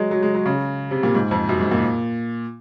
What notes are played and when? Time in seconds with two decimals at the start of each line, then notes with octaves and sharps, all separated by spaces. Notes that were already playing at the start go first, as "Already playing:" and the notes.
Already playing: F#3 G#3
0.11 F#3
0.23 G#3
0.34 F#3
0.46 C#3
0.91 C3
1.03 A#2
1.15 G#2
1.31 F2
1.49 F#2
1.61 G#2
1.71 A#2